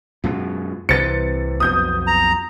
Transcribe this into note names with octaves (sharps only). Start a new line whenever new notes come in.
F#2 B2 G#3 F4
C2 C3 E3 B4 C5 A6 C#7
B1 F2 B2 D#6 G6
A#5